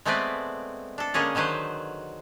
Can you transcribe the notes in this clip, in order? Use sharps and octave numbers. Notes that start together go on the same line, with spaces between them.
G#3 A3 B3 C4 B4 D5
D4 A4
D3 G#3 A#3 C#4 G#4
D3 D#3 F#3 B4 C5